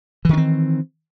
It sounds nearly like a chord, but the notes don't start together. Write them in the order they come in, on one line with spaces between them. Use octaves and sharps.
E3 D#3 D4 C4